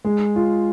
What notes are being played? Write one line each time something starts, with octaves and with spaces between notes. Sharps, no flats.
G#3
F4